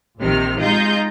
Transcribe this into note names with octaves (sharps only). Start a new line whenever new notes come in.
A#1 C3 D#3 F6
G#3 D#4 F4 D#5 G6